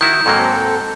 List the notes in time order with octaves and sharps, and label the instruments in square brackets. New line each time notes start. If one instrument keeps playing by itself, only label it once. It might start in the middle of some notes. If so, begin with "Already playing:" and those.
[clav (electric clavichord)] D#3 E4 F#4 [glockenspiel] G6
[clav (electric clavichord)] G#2 F#3 A#3 [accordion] C4 A4